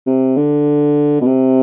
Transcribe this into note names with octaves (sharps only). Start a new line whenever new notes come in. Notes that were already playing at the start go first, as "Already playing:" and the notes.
C3
D3
B2
C3